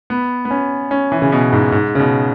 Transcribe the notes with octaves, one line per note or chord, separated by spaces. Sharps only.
B3
B3
C#4
C#4
E3
C#3
B2
G#2
G#2
C#3
B2